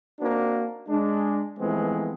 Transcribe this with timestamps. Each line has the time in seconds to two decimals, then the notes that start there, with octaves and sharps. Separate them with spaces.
0.20 A#3 C4 D4 D#4 F#4
0.89 G#3 D4
1.59 E3 F3 G#3 A3 B3 C4